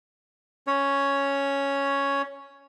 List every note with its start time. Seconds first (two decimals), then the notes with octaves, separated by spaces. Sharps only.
0.67 C#4 C#5